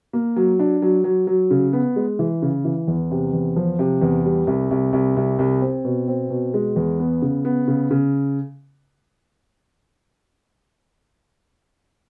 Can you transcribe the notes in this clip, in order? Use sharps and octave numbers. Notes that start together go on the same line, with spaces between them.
A#3
F#3
D4
F#3
F#3
F#3
C#3
B3
G#3
E3
C#3
E3
E2
C3
E2
F3
C3
E2
G3
C2
C2
C2
C2
C2
C4
B2
C4
B2
G#3
E2
B3
C#3
B3
C#3
C#3